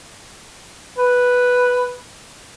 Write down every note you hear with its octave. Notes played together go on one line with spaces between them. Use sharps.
B4